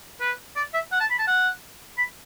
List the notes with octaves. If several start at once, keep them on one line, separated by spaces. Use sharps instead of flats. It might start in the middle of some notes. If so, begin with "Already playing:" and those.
B4
D5
E5
F#5
A5
B5
A5
F#5
B5